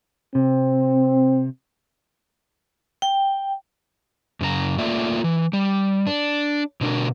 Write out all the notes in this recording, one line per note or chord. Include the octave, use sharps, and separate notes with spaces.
C3 C4
G5
F#2 C#3 F4 A#5
A3 A#3 F4 D5 E5
E3
G3
D4
B2 D3 D4 F#4 A#4